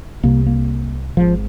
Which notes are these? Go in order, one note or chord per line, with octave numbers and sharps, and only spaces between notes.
C2 C3 A#3
A#3
G#1 G#2 F3